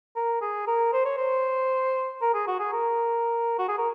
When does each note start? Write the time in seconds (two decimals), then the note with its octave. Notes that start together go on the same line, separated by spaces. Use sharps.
0.16 A#4
0.41 G#4
0.67 A#4
0.93 C5
1.05 C#5
1.17 C5
2.22 A#4
2.34 G#4
2.47 F#4
2.60 G#4
2.73 A#4
3.59 F#4
3.68 G#4
3.78 A#4